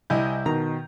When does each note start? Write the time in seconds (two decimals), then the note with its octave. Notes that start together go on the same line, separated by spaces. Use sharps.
0.10 C2 E4 D#5 G#5 G6
0.46 B2 D#3 A#5